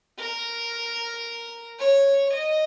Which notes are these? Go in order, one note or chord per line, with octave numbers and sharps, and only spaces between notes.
A#4
C#5
D#5